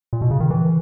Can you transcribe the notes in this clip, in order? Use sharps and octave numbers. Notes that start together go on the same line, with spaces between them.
A#2
B2
C#3
D#3
E3